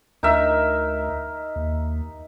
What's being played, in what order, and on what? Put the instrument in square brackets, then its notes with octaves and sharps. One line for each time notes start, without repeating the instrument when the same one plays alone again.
[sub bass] D2 [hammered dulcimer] D#4 A#4 E5
[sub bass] D#2